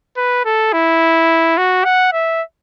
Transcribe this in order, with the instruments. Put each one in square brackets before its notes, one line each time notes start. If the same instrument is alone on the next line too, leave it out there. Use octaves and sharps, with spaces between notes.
[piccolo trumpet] B4
A4
E4
F#4
F#5
E5